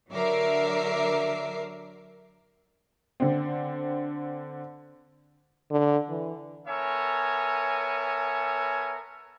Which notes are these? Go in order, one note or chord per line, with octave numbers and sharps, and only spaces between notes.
D3 F#3 A#4 E5 D6 C7
D3 C4
D3
E3
B3 A4 A#4 C#5 E5 G#5